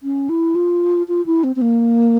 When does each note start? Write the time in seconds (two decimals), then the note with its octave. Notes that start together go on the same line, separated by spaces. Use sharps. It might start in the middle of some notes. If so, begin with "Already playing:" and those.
0.03 C#4
0.29 E4
0.55 F4
1.08 F4
1.26 E4
1.44 C4
1.56 C4
1.62 A#3